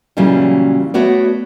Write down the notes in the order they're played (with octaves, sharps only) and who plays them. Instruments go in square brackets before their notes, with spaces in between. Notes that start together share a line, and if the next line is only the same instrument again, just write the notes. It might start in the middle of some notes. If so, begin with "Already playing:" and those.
[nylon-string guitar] A#2 C#3 E3 F#3 G3
A3 B3 F#4 C#5 D5